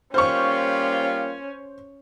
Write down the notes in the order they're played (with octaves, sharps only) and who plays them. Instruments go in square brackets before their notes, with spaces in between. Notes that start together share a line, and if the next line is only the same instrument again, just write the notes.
[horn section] G3 A#3 F4 [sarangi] C#4 [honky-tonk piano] C5 C#6